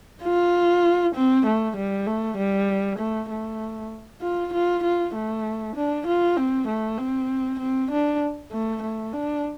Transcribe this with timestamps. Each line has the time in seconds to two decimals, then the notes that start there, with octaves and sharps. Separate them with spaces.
0.23 F4
1.15 C4
1.46 A3
1.76 G3
2.06 A3
2.37 G3
2.98 A3
3.30 A3
4.21 F4
4.53 F4
4.83 F4
5.15 A3
5.75 D4
6.07 F4
6.36 C4
6.67 A3
6.98 C4
7.59 C4
7.91 D4
8.51 A3
8.82 A3
9.13 D4